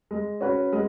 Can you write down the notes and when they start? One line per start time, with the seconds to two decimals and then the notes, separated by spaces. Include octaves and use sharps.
0.11 G#3
0.41 C#4 F#4 B4
0.73 G#3